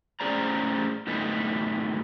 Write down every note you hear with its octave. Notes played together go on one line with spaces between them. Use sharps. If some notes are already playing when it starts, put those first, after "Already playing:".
A2 C#4 G#4 C5 D5 A#5
F#2 A2 D3 B3 D#4